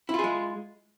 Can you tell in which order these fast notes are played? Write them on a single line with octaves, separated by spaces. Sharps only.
E4 F4 G#4 G#3